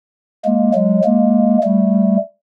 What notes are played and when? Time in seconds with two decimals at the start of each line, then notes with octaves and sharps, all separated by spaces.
0.45 G#3 A#3
0.74 F#3 G#3
1.04 G#3 A#3
1.63 G3 A3